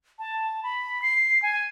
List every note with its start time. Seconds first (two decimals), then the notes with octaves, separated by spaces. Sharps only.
0.19 A5
0.63 B5
1.02 C7
1.42 G#5